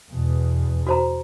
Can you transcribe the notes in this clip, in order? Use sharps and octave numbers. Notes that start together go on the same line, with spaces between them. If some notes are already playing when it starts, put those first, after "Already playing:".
E2 B2
F#4 C5 A#5